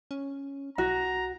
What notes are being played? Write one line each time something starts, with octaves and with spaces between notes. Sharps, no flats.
C#4
B1 F#4 A#5